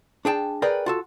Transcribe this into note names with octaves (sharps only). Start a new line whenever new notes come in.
D4 G#4 G5 A5
G#4 A#4 B4 D5 G5
F4 F#4 A4